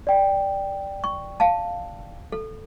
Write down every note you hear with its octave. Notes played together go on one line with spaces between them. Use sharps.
D5 G5
C#6
F5 A5
A4